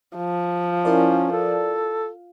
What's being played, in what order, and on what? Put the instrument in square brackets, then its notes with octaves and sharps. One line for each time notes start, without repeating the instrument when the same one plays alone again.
[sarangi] F3
[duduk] C#4 [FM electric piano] E4 A#4 D5
[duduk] A4